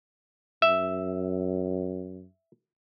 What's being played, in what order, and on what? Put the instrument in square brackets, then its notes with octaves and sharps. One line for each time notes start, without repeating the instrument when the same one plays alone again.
[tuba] F#2 [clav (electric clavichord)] E5